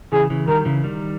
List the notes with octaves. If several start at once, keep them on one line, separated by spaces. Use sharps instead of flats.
C#3 E3 G#4
C#3 E3
D#3 G3 A#4
C#3 E3
D#3 G3